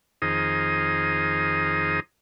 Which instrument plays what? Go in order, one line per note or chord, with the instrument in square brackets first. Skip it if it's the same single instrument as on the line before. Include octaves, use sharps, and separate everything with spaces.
[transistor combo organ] F2 D#3 D#4 G#4 C5 D#6